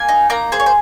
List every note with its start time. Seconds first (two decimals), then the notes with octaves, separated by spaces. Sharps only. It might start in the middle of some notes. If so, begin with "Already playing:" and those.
Already playing: A#3 G#5
0.09 D#4
0.30 A#3 A#5
0.52 G#4 C5
0.60 C#5
0.66 C5